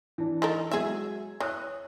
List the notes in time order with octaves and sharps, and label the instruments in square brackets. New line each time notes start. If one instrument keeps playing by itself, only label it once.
[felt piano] E3 D4
[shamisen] D#4 A4 A#4
[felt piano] F#3 G#3 G#6 [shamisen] G#4 E5
[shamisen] E3 [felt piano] C#5 D#6 F#6